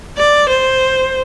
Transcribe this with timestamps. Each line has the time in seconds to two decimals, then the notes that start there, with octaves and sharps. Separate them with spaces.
0.17 D5
0.49 C5